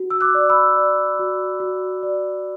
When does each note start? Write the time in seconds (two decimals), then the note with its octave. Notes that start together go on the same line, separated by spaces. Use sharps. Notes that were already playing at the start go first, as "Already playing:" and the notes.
Already playing: F#4
0.10 E6
0.21 D6 F#6
0.35 D5
0.50 B5 E6
0.77 D5
1.19 F#4
1.60 F#4
2.03 D5